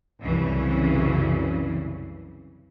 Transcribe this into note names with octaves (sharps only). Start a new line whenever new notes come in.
C2 F#2 C#3 E3